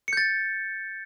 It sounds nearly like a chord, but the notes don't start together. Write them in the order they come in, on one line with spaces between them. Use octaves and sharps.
C#7 G6 A6